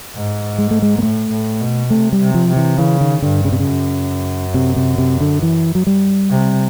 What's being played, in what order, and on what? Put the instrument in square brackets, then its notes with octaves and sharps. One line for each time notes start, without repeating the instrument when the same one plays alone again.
[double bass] G#2
[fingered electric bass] G#3
A3
G#3
A#3
[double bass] A2 [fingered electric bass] A3
[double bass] A2
B2
[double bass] C3 [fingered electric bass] A3
[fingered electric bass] G3
[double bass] C3
[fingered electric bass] F3
[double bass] C3
[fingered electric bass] E3
[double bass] C#3 [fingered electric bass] E3
[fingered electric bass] D#3
[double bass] G2 [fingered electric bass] D3
[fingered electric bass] C#3
C3
C#3
[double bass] F#2
[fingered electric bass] C3
C3
C3
D3
E3
F#3
G3
[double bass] C3